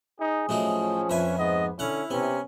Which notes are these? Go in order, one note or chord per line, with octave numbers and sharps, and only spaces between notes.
D#4 G#4
A2 F3 F#3 C#4 D#4
F2 B4 E5 G#5
G#2 B3 D#5
D3 C#4 E4 F5 F#5
C3 B3 C#4